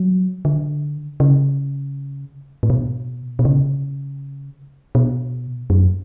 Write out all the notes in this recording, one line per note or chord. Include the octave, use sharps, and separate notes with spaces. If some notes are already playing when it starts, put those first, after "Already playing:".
Already playing: F#3
D3
C#3
A2
B2
B2
C#3
B2
F#2